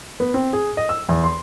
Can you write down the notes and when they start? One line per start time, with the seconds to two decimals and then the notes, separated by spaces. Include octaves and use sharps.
0.20 B3
0.34 C4
0.53 G#4
0.77 D#5
0.89 E6
1.09 E2
1.24 C6